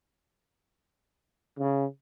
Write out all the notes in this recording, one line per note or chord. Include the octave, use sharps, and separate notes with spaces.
C#3